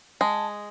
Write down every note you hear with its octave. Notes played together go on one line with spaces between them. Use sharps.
G#3 A5